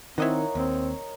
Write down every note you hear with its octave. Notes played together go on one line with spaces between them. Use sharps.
D#3 C4 D#4 E4 A#4 C#5 D#5 F#5
D#2 C4